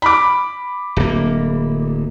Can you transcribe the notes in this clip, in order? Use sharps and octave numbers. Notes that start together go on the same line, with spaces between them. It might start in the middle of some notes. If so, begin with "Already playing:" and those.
B5 D6
D1 A#3